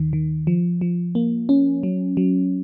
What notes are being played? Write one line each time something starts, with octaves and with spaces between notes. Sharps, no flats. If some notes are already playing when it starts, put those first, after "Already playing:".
Already playing: D#2 D#3
D#3
F3
F3
A#3
C#4
F#3
F#3